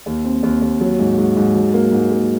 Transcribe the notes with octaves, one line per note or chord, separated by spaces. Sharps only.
D#2
C4
D#2
D#2
F#3
G#2
G#2
G#2
F#3
A#3
G#2
A#3